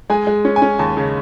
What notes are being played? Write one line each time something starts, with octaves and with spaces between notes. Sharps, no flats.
G#3 G#5
G#3
C#4
G#5
C#4
D#2 A5
C#3